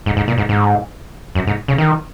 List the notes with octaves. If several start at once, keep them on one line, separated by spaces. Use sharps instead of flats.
G#2
G#2
A#2
G#2
G#2
F#2
G#2
C#3
D#3